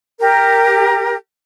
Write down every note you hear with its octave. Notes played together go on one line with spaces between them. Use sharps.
G4 A#4